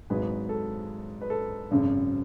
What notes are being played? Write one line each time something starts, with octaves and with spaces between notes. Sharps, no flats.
G#1 G#2 F#3 G#4 B4
A4
B4
A4
G#1 F#2 C#3